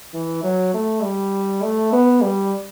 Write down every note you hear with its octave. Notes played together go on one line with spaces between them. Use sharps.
E3
F#3
A3
G3
A3
B3
G3